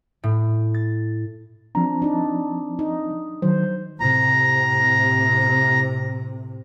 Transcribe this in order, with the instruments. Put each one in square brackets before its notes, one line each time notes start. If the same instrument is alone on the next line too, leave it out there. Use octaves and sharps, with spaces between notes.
[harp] A2
A6
[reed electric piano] F3 C4 A#5 [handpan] D4
[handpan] D4 D#4
D#4
[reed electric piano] D#3 F#3 [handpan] C5
[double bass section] A2 C3 [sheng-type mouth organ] A#5